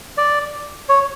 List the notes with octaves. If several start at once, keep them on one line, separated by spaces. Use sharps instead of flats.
D5
C#5